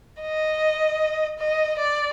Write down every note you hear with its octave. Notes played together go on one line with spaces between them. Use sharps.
D#5
D#5
D5